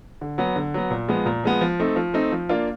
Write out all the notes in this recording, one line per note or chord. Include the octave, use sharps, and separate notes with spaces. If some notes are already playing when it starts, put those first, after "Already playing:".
D3
F#3 B3
D3
F#3 B3
A#2
F3 G#3 B3
A#2
F3 G#3 B3
F3
A3 C4 D#4
F3
A3 C4 D#4
F3
A#3 D4 F4